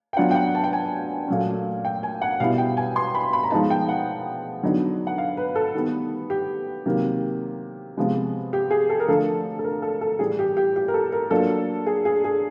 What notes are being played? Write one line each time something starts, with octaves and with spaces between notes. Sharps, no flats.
G5
F#3 B3 D4 F4 F#5
G5
F#5
A5
G5
G#5
A#2 F#3 A3 C#4
G5
G#5
F#5
B2 G3 B3 E4 F5
G5
G#5
C6
B5
B5
A#5
F3 G#3 B3 D#4 A5
G5
F#5
D3 F#3 B3 D#4
F#5
F5
B4
A4
D#3 G3 B3
G4
C3 D#3 F#3 A#3
C3 F3 G#3 B3
G4
G#4
A4
A#4
D3 F3 A3 A4
A4
A#4
A4
A4
A2 E3 G3 G#4
G4
G4
G4
A#4
A4
A#4
F#3 A#3 D4 F4 A4
G#4
G#4
G#4